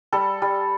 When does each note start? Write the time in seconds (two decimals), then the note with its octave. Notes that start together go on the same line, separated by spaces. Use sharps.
0.13 G3 A4
0.42 G3